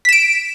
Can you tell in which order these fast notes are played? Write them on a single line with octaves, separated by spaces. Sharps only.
B6 E7 D7